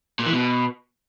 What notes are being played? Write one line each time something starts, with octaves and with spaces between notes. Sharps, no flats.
A#2
E3
B2